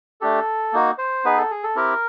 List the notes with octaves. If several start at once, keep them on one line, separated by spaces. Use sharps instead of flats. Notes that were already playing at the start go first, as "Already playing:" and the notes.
A3 D4 G4 A4
A#3 D#4 F#4
C5
B3 D#4 G#4 B4
A4
G#4
A4
C4 E4 G4 A#4